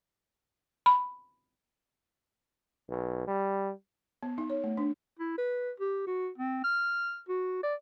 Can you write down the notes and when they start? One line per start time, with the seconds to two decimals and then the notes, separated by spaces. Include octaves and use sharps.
0.86 B5
2.89 B1
3.27 G3
4.23 B3
4.38 D#4
4.50 C#5
4.64 A3
4.77 D4
5.19 E4
5.38 B4
5.80 G4
6.07 F#4
6.38 C4
6.64 F6
7.28 F#4
7.63 D5